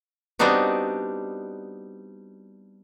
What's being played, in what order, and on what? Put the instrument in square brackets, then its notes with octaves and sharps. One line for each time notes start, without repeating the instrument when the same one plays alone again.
[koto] G3 B3 C4 D4 D#4 F#4